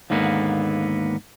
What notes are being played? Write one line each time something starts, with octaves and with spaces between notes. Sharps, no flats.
D#2 G#2 D3 A#3 B3